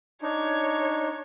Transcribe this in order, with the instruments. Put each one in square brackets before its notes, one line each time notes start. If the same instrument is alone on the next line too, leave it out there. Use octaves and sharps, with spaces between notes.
[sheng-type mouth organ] D4 D#4 [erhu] C#5